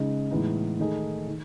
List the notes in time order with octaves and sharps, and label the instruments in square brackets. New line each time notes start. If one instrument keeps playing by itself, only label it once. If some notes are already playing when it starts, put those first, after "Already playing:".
Already playing: [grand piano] C#3 G#3 D#4
A2 E3 G#3 B3 D#4
D#3 A3 D#4 G#4
D#3